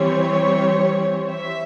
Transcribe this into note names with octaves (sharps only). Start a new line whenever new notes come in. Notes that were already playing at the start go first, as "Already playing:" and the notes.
Already playing: E3 G3 C4 C#5
E5